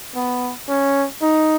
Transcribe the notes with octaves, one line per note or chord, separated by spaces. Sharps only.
B3
C#4
D#4